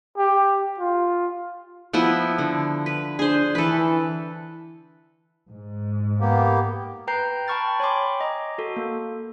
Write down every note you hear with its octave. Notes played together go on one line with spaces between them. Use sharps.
G4
F4
F3 B3 E4
D3
B4
D4 G#4 C5
E3 A4 B4
G#2
A#3 B3 G4
B4 G5 A#5 G6 C7
G5 A5 B5 C#6 F6 A6
C#5 G5 G#5 B5 C6 D6
D#5 A#5 D6
F#4 A4
A#3